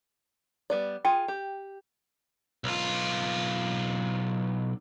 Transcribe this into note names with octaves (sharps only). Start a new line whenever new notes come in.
G3 B3 D5
F4 G#4 G5
G4
B1 F4